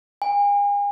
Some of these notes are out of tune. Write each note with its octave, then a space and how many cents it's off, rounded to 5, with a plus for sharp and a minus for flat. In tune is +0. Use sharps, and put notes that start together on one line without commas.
G#5 -40